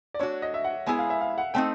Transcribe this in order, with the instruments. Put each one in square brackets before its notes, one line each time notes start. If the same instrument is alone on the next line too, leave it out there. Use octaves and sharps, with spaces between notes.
[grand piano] D5
[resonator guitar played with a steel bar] A3 D4 F#4 [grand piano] C#5
[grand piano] D#5
E5
F#5
[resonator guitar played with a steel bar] G#3 B3 E4 G#4 [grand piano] G#5
[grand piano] F5
E5
F5
F#5
[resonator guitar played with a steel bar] A3 C4 D#4 [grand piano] G5